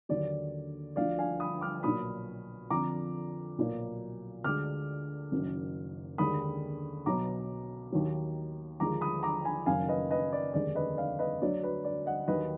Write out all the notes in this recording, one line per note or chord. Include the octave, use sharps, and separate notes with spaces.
D#2 D3 F#3 D5
D2 D3 F3 D5 F5
F5 G#5
B5 D#6
D6 F6
B1 A#2 F#3 B5 D#6
F2 D3 F3 A#5 D6
B1 A#2 F#3
D2 D3 G#3 D6 F6
F#1 F#2 D#3 F#3
D#2 D3 G#3 B5 D#6
B1 B2 F#3 A#5 D6
D#2 D#3 F#3
D#2 D3 F3 G#3 A#5 D6
B5 D#6
A#5 D6
G#5 B5
F#1 F#2 D#3 F5 G#5
B4 D#5
B4 D#5
D5
F1 D#2 D3 G#3 D5
B4 D#5
D5 F5
B4 D#5
D2 D3 F#3 D5
B4
D5
D#5 F#5
D#2 D#3 F#3 B4 D#5